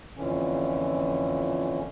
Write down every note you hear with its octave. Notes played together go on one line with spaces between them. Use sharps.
F2 A#2 D3 E3 C#4